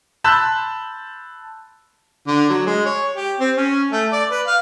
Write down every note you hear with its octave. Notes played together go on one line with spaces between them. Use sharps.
A5 B5 C6 E6 F#6 G6
D3
F#3
G#3
C#5
G4
C4
C#4
A3
D5
B4
F5